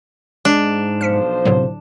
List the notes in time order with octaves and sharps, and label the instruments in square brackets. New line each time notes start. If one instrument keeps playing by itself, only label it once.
[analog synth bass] G#2 [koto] D4
[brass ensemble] B1 F3 C5 [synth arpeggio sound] F6 B6 C#7
[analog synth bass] C2 [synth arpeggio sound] A2 D3 F#3